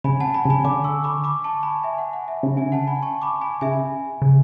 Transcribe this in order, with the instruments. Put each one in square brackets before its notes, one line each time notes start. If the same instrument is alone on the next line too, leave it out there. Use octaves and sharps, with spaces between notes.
[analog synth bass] C#3 [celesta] G#5 B5
[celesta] F#5 A5
G#5 B5
[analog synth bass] C#3
[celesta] G#5 B5
[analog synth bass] D3 [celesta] B5 D6
[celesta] C#6 E6
B5 D6
B5 D6
A5 C#6
G#5 B5
E5 G#5
F#5
F#5
E5
[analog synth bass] C#3
[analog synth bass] D3 [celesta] E5 G#5
[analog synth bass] C#3 [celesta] F#5 A5
[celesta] G#5 B5
A5 C#6
B5 D6
G#5 B5
[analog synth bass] C#3 [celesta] E5 G#5
[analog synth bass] C#3